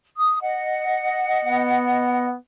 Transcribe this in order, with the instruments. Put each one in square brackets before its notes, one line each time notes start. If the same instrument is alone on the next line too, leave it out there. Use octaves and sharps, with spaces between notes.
[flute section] D#6
D#5 F#5
[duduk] B3